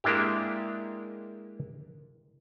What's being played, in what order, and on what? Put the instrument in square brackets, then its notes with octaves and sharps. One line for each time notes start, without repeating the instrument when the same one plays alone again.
[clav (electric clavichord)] G#3 A#3 D4 E4 G4